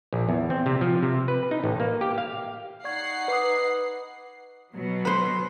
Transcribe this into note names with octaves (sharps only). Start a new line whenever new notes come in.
A#1
E2
C4
C3
F3
C3
B4
D#4
A1
A#3
G4
F5
D#4 D5 F#5 C#6 G#6 C7
B4 D6 D#6
B2 F#3
B4 C5